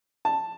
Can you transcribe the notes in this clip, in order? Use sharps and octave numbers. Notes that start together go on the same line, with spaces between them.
A5